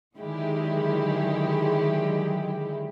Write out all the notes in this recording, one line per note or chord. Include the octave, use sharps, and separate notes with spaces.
D3 D#3 F#3 G#3 E4 G4